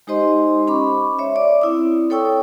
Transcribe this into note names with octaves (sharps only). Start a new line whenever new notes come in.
G#3 D#4 G4 C5 D#5 C6
C#4 B5 C#6 D6
C#5 E5
D5 D6
C4 E4 D#6
A4 C#5 G5 C#6 E6